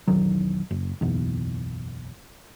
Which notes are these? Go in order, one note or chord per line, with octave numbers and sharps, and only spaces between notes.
B1 E2 D#3 F#3
F#1
F#1 B1 E2